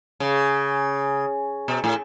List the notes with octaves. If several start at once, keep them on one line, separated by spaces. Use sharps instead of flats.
C#3
B2
A2